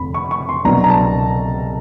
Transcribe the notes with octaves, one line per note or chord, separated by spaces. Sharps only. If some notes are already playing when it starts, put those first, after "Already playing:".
Already playing: F1 F2 D3 B5
C#6
C#6
C6
C2 B2 F#3 B3 D4 A#5
A#5
A5